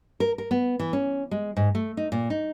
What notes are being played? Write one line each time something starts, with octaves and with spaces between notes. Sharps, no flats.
A#4
A#4
B3
E3
C#4
G#3
G#2
A3
D#4
A#2
D#4